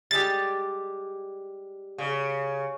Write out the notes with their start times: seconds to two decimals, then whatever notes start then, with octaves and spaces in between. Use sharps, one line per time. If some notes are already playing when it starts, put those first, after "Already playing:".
0.11 G3 G#3 G4 A6
1.98 C#3